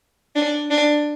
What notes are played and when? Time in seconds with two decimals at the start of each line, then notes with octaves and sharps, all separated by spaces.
0.35 D4
0.70 D4